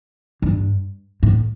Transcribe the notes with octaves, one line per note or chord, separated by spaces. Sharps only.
G2
A2